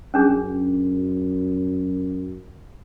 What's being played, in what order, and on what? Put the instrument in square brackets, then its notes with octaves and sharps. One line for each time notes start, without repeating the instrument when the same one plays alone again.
[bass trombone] F#2 [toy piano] C#4 D4 G#4